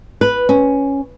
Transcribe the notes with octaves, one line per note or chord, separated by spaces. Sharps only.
B4
C#4